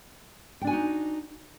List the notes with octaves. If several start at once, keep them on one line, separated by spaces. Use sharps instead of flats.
D4 D#4 F#4 G5 G#5